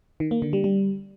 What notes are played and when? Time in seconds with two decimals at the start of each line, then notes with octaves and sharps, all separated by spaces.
0.20 D#3
0.31 A#3
0.42 D3
0.53 G3
0.64 G3